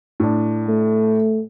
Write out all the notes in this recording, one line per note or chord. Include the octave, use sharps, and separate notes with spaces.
A2 D4
A3